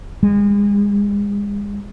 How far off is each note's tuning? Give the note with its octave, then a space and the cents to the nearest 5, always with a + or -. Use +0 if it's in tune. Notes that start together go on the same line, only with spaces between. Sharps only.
G#3 -35